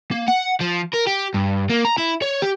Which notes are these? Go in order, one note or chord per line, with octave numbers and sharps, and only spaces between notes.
A#3
F#5
F3
A#4
G4
G2
A#3
A#5
E4
C#5
G4